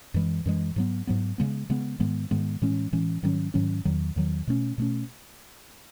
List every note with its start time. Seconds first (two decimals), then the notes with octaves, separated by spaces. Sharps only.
0.14 F#2 E3 G#3
0.46 F#2 E3 G#3
0.76 G#2 F#3 B3
1.07 G#2 F#3 B3
1.38 C#3 G#3 B3
1.70 C#3 G#3 B3
1.99 G#2 D#3 G#3 B3
2.31 G#2 D#3 G#3 B3
2.62 A2 E3 G#3 C#4
2.92 A2 E3 G#3 C#4
3.23 G#2 D#3 F#3 C#4
3.54 G#2 D#3 F#3 C#4
3.85 E2 D#3 F#3
4.16 E2 D#3 F#3
4.47 B2 A3 C#4
4.78 B2 A3 C#4